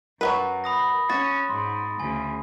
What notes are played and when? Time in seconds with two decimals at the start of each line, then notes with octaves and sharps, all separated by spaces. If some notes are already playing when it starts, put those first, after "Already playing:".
0.21 F#2 F#3 G#3 A#4 B4 F#5
0.64 B5 D#6 A#6
1.09 C#4 F#4 A6
1.49 G#2 C6
2.00 D2 C#3 G#5